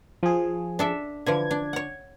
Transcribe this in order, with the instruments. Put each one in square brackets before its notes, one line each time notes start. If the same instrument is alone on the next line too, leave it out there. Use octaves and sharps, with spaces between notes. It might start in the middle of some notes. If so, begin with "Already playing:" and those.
[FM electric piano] F3 G#4
[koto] D4 A4 E5
[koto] D3 E3 F3 [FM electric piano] G#6
[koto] D4
C#5 F#5